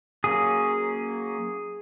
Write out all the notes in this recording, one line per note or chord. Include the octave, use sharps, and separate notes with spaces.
F#3 A#3 C#4 G#4